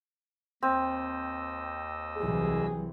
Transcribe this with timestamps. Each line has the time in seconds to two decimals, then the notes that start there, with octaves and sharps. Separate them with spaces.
0.63 D#2 C4 D#5 E6
2.17 C2 E3 F#3 G#4